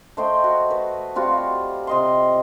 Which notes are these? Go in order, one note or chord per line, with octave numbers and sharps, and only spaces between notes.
A3 C5 D#5 G5
F#4
B4
G3 C4 F4 F#4
F5
C3 D#5 C6